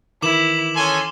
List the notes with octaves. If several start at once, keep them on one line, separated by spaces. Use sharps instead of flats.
D#3 E3 E4 D6 E7 F#7
C#4 A4 G#5 C6